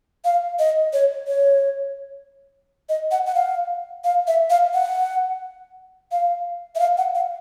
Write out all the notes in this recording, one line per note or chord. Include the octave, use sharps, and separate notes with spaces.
F5
D#5
C#5
C#5
D#5
F#5
F#5
F5
F5
E5
F5
F#5
F5
E5
F5
F#5
F5